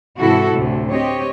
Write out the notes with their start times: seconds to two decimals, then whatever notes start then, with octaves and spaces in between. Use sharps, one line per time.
0.18 G#2 C3 E3 E4 F#4 A4
0.52 D2 A2 C3
0.91 C4 G4 C#5 D#5